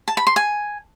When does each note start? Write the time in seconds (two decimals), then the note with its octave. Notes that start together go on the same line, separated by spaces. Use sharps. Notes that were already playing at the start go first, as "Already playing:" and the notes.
0.08 A5
0.17 B5
0.27 C6
0.36 G#5